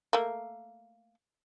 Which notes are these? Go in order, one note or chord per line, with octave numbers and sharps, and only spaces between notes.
A3 A#3